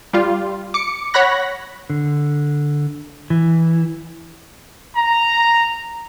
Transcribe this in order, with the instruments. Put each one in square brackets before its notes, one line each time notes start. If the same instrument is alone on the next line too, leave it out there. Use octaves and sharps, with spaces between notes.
[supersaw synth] G3 F4
D6 C#7
C#5 F#5 B5 F#6 A#6
[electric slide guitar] D3
E3
[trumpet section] A#5